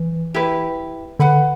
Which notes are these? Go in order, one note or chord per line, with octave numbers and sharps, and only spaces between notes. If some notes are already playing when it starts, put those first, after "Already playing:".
Already playing: E3
E4 G4 B4
D3 B4 F#5 B5